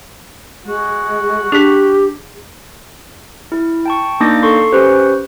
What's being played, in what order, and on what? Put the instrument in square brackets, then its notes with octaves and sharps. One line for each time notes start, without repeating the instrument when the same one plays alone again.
[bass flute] G#3 [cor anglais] F#4
[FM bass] D4 [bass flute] G4 [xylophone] G#4 B6
[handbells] E4
G5 A5 C#6
A#3 D4 D#4 D6 G6 A#6
A4 C6 C#6 C7
C#4 G4 B4 C5 C#6